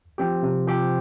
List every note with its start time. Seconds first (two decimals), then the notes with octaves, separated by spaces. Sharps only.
0.18 F3 C4 G4
0.43 C3
0.67 F3 C4 G4